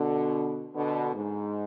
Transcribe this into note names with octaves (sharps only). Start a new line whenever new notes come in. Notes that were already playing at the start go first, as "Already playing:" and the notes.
Already playing: B2 D3
B2 D3
G#2